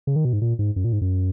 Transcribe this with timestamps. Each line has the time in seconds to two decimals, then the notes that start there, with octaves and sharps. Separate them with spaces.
0.07 C#3
0.16 D#3
0.25 B2
0.33 G#2
0.42 A#2
0.59 G#2
0.76 F#2
0.84 A#2
0.93 G#2
1.01 F#2